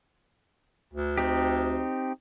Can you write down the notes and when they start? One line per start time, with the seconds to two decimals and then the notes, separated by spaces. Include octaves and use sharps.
0.93 D2
1.17 C4 D#4 G4